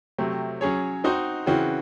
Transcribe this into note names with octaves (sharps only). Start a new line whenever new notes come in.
C3 F#3 A3 C4
F#3 C#4 G#4 C#5
C4 D#4 F#4 C5 D#5
C#3 E3 C4 F#4